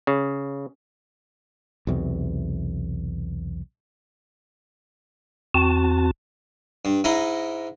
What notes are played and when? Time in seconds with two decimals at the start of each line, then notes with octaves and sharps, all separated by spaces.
0.07 C#3
1.87 B1 E2 C3
5.54 E2 C4 F#4 A5
6.85 G2
7.04 G#2 E4 D#5 A#5